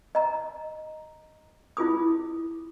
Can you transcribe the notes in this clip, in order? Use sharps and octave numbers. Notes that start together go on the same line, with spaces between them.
D#5 A#5
E4 F4 G#4 D#6